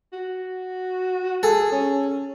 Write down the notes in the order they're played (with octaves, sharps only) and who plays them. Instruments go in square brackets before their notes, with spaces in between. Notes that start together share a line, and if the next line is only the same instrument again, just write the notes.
[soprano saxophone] F#4
[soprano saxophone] G#4 [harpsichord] A4
[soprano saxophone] C#4